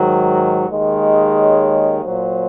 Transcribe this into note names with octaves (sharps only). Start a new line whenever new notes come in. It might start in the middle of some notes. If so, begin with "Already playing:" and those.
Already playing: G#2 D#3 F#3
D#2 D#3 G#3
C#5
A#2 F#3 C5